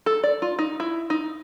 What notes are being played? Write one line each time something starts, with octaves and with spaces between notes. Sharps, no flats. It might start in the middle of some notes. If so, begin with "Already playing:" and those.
A4
D5
F4
D#4
E4
D#4